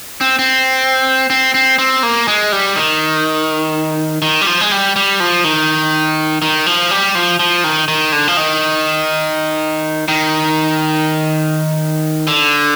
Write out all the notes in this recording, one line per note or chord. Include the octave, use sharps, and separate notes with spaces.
C4
C4
C4
C4
C4
A#3
G#3
G3
D#3
D#3
G3
F3
G#3
G3
G3
F3
D#3
D#3
F3
G3
F3
F3
D#3
D#3
D3
F3
D#3
D#3
D3